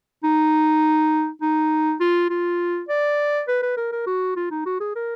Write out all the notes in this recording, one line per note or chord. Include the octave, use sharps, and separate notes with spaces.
D#4
D#4
F4
F4
D5
B4
B4
A#4
A#4
F#4
F4
D#4
F#4
G#4
A#4